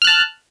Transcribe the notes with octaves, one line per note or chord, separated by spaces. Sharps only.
A5 F6 F#6